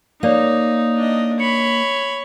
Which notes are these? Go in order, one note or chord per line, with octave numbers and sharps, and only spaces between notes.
A#3 D#4 C#5 D5 F5
D4 D#5
C#5 B5 C#7